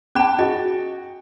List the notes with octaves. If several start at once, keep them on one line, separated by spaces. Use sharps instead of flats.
C#4 G5 A5 B5
F4 F#4 G#4 D#5